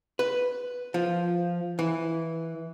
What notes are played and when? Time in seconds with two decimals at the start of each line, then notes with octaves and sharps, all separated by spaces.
0.19 B4
0.94 F3
1.79 E3